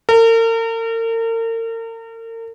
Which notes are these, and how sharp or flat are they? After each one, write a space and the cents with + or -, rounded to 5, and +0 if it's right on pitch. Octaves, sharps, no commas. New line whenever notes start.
A#4 -40